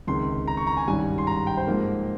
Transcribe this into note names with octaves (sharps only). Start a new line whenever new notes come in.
C#2 C3 D#3 C6
A#5
C#6
A#5
G#5
G#1 G2 G3 C#4 G#5
C6
A#5
G5
C5
G#2 F3 A#3